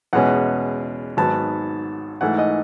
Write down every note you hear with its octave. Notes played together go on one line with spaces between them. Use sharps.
E2 B2 G#3 C#4 F#5
G#1 G#2 F#3 B3 A5
G#2 E3 A3 F#5
D#5